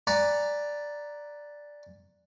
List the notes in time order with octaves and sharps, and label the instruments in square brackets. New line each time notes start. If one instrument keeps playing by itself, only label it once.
[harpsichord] D5 F#5 G#5 A#5 B5